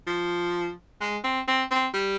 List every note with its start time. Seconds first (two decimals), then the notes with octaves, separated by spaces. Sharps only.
0.07 F3
1.01 G#3
1.24 C4
1.48 C4
1.71 C4
1.94 G3